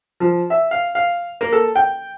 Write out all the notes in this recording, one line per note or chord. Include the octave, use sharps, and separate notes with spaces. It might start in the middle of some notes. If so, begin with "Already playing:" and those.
F3
E5
F5
F5
A#3
A4
G5